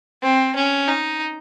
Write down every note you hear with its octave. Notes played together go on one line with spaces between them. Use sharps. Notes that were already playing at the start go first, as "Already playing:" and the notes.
C4
C#4
D#4